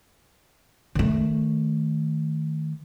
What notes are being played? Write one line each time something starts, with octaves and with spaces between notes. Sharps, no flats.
D#3 A3